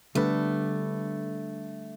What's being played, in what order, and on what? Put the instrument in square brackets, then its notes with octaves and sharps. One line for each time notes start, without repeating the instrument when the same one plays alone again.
[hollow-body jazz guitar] D3 G3 B3 D4 B4 [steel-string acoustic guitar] A3